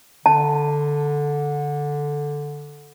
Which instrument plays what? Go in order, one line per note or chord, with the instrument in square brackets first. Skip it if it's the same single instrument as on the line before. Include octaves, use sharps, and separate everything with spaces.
[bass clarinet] D3 [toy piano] A5